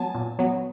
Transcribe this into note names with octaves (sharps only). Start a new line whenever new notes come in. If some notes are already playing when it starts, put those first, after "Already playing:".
Already playing: F#3 B3 G#5 A5
A#2
F#3 B3